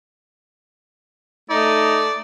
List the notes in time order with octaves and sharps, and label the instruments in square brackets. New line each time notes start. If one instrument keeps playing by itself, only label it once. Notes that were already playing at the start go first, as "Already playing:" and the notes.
[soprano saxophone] A3 [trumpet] D#4 [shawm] D5